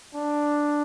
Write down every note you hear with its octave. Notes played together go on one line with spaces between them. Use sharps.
D4